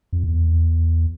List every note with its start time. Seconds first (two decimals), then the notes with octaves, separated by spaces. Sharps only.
0.13 F2
0.24 E2